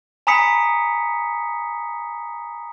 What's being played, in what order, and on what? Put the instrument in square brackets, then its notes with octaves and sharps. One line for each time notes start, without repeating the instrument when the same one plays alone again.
[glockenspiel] G#5 A#5 B5 D#6 B6 C#7